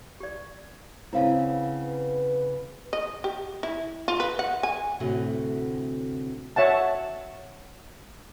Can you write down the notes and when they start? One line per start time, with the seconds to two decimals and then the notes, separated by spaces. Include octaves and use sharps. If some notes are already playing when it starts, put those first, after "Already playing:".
0.20 G4 D5
1.13 C#3 B3 C4 E4 F5
1.82 B4
2.93 D#5
3.24 G4
3.63 E4
4.08 F4
4.20 B4
4.39 F#5
4.63 G#5
5.00 D2 A2 C3 A3 F#4 F#5
6.56 C#5 E5 F#5 A5